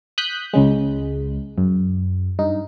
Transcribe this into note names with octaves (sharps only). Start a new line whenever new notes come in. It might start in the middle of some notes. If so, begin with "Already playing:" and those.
D#6 F#6 G6 B6
C#2 C#3 G#3
F#2
G2 D#4